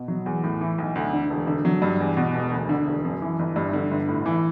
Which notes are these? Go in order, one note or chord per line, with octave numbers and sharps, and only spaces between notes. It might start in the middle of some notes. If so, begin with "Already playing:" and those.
Already playing: B2
F#3
E2
A2
E3
B1
D2
D3
E1
D3
F#3
G2
E2
B2
E1
D2
D3
E1
F#2
E3
G1
G2
D3
G1
A2
E3